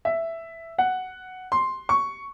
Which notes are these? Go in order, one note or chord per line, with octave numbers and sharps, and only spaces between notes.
E5
F#5
C6
C#6